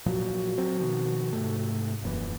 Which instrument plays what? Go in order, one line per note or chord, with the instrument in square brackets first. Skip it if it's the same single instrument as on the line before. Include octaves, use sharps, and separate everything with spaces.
[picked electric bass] A#2 F3 F#3 [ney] F#4
[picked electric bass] F#3 C4
B2 D#3 F3
G#2 C3 A3
[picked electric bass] D#1 F#2 E3 [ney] A#3